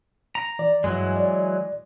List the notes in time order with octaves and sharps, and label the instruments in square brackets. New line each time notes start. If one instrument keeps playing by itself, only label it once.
[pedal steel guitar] A#5
[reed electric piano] E3 D5
[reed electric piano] G2 [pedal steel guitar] E3 F#3 G#3
[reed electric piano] D5